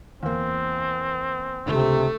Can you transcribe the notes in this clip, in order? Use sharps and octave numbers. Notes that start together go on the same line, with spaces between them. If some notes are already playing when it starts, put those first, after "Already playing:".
E2 A#3 C4
C#2 G2 C3 A3